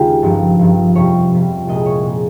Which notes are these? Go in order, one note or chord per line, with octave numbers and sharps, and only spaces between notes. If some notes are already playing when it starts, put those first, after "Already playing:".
Already playing: D#2 C#3 G#3 D#4 F4 G4
G1 G2 F3
G1 G2 F3
F2 C3 G3 C#5
F2 C3 G3
C2 A#2 G#3 D#5
C#5
A#2 G#3